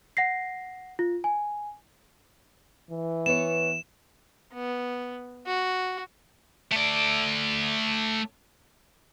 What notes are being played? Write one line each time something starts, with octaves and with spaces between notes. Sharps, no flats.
F#5 A#6 C7
F4
G#5
E3
B3 B4 C#5 E7
B3
F#4
A3 D5